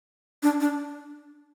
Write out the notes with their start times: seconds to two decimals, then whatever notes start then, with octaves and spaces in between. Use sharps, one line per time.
0.43 D4
0.60 D4